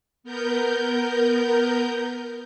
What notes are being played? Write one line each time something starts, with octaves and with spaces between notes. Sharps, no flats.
B3 A#4 G6